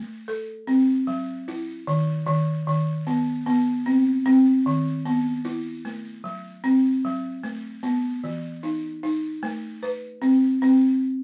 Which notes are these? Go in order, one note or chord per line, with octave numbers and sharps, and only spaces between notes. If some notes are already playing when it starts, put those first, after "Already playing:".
Already playing: A3
A4
C4
F#3
E4
D#3
D#3
D#3
B3
B3
C4
C4
D#3
B3
E4
A3
F#3
C4
F#3
A3
B3
E3
D#4
D#4
A3
B4
C4
C4